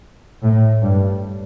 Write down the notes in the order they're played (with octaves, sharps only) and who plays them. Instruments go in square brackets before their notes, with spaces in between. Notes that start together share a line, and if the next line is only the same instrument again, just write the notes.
[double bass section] A2
G2